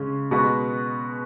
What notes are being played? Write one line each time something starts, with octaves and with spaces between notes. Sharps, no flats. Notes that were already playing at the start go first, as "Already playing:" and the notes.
Already playing: C#3 G#3 C#4
B2 G#3 B3 F#4 B4